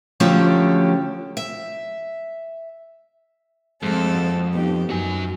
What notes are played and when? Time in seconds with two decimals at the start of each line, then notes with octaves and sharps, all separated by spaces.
0.20 D3 F3 F#3 A3 C#4 G4
1.37 E5
3.83 F2 G#3 A3 C4 A4
4.14 F#4
4.55 B3 D#4 G4
4.90 F#2 F#4 G#5